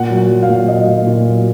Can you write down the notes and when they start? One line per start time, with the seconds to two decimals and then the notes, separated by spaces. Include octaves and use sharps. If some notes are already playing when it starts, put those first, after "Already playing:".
Already playing: A#2 F#5
0.10 F#3
0.17 F#5
0.30 F#3
0.43 F5
0.49 A#2
0.68 F#3 D#5
0.76 F5
0.83 A#2 D#5
1.07 A#2
1.26 F#3